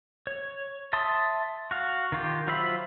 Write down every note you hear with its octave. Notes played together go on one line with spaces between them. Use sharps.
C#5
E5 A5 C6 D#6
F#4 F5
D#3 F4 G4
F#3 F4 C5 E5 B5